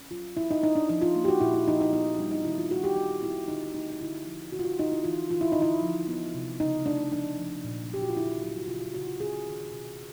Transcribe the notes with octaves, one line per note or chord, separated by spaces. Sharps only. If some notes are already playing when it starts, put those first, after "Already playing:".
Already playing: C#4
F#3 F4
B3 E4
D#4
D4 D#4
D4
F3 D#4
F4
A#3
G4
F#4
A#2 E4
E4
F3 D#4
D#4
B3 D#4
G3 D4
D#4
D#3 E4
F4
G3 F#4
G4
C4 F#4
C4 E4
D3 D#4
A3 D#4
D#4
D3 E4
F3
D3 F#4
F4
F#4
D3 D#4
E4
E3 F4
E3 F4
E4
D#4
D3 E4
F3
B3
C3
C#3 D#4
A3 D4
F3 D4
F3
A#2
F#3 G4
F#4
F4
D3 E4
F4
F#3 G4
F#4
C#3 F4
F#4
C#3 F#4
F4
C#4 G#4
D#3
B2